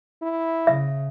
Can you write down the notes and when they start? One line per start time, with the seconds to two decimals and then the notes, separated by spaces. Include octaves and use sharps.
0.23 E4
0.67 C#3 E5